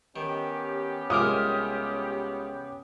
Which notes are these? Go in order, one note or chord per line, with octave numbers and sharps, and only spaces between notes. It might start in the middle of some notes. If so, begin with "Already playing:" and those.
D#3 B3 C#4 G4
C2 G#3 F4 A#4 D6 D#6 F6